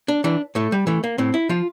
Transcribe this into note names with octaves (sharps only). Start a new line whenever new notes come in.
D4
E3 D4
A2 A3
G3
E3 A3
A#3
A2 C4
E4
F3 F4